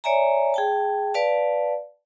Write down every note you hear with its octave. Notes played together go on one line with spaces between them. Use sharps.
C#5 D5 E5 G#5 A#5
G#4 G5 A5
B4 D5 F5 A5